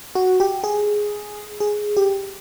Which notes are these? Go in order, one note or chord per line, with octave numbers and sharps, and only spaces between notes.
F#4
G4
G#4
G#4
G4